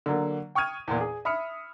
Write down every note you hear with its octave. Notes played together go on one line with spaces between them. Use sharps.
D3 F#3 A#3
G5 C#6 D#6 F6 G#6 D#7
E2 A#2
G#4
E5 B5 D#6 F6 C#7